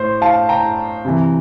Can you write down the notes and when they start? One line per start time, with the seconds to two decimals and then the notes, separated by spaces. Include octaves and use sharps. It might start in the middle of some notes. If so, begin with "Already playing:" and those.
Already playing: A2 C5
0.22 F5 A5
0.49 G5 A#5
1.05 C3 E3